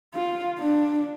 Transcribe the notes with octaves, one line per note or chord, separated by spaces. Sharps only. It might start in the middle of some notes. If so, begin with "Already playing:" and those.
F4
D4